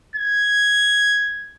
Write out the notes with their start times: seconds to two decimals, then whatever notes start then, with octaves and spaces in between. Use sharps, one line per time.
0.16 G#6